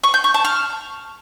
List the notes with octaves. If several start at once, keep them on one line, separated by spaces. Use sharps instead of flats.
C#6
G6
C#6
A5
F6